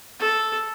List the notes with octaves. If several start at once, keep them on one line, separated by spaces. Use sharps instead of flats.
A4